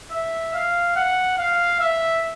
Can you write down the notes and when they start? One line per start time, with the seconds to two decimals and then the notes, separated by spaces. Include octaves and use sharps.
0.11 E5
0.54 F5
0.96 F#5
1.38 F5
1.80 E5